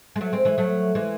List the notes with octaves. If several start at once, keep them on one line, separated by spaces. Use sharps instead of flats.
G#3
F#3 A3
G#3 C4
E3 G#3
F#3 A3
E3 G#3